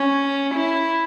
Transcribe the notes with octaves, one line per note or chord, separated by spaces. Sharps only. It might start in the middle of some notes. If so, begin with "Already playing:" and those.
Already playing: C#4
E4